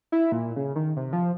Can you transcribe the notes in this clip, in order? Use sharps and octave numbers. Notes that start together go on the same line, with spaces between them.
E4
A#2
C#3
D#3
C3
F3